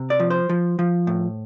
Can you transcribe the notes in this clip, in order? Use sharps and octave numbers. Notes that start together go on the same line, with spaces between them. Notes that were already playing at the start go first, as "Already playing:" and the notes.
Already playing: C3
D5
F3
C5
F3
F3
A2